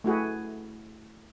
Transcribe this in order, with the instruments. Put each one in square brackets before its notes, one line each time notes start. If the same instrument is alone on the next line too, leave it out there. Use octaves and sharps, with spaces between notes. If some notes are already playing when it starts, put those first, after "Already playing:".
[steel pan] A3 E4 F#4 G#4